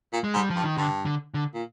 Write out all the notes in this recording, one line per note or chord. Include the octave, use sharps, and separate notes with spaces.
A#2
G#3
G#2
G3
F3
G2
D#3
G2 D3
D3
D3
A#2